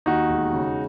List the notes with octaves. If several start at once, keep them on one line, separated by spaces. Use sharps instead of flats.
D#2 D#4 F#4
E1
C#3